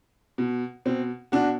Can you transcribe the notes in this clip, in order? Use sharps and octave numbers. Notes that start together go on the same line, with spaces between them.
B2
B2 C4
B2 D4 F#4